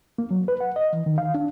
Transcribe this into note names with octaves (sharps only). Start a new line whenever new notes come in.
A#3
F#3
B4
F#5
D#5
E3
D#3
F5
D4